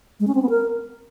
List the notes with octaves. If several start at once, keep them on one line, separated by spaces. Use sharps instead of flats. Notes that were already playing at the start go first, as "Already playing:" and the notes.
G#3
C#4
C4
B3
A#4